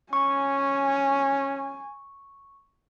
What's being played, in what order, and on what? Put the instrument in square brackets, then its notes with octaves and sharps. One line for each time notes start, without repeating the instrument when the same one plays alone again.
[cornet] C#4 [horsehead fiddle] G#5 [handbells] C#6